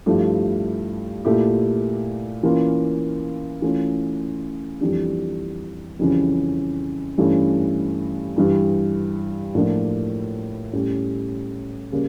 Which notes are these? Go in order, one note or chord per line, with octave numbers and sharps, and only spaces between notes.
G2 F3 A3 E4 G4
A#2 A3 E4 G4
E3 A#3 C#4 F4
E3 A3 C#4 F4
F2 E3 G3 D4 G4
F2 C#3 E3 G3 C#4
G2 E3 A3 C#4
G2 E3 G3
A2 F3 A#3 D4 F4
A2 G3 C#4 G4
C#3 G3 A#3